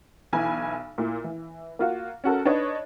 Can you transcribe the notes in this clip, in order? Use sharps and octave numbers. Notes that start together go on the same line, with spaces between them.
B1 E3 G#5 B5
A#2 E4
E3
A#3 F4 F#4
C#4 F#4 A4 A#4
D4 D#4 B4 C#5 D#5